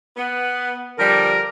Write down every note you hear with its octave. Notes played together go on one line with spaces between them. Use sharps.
B3
D3 F3 G3 A#4